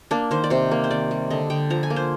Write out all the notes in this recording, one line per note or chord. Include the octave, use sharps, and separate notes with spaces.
A#3 D4
D#3 C5
D5
C3 C5
A#3
C5
D#3 D5
G3
D3 D#5
D3 G5
F3 A#5
G#5
A#3
C5